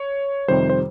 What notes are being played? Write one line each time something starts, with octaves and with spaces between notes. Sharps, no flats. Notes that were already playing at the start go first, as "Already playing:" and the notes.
Already playing: C#5
F2 C3 D#3 G3 C5
C5